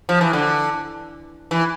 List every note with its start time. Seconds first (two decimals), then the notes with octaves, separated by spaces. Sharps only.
0.09 F3
0.21 E3
0.33 D3
1.51 E3